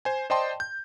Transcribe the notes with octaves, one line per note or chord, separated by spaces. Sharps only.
C5 G#5
C5 D5 D#5 G5 A5 C6
G6